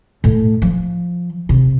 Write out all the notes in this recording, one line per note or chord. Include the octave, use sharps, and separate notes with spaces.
A2
F3
C3